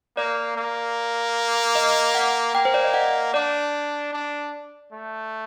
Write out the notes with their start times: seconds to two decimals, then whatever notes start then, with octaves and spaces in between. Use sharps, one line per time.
0.17 A#3 D5
0.56 A#3
1.75 D#5
2.15 F#5
2.55 A#3 G5
2.65 C5
2.74 D5
2.84 D#5
2.94 F#5
3.34 D4 D5
4.12 D4
4.92 A3